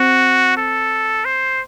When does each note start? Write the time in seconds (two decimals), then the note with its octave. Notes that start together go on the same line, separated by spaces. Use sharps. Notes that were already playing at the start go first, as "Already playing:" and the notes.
Already playing: C4 F#4
0.57 A4
1.25 C5